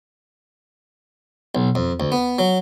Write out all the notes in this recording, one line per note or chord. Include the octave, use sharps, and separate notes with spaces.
B1
F2
D2
B3
F#3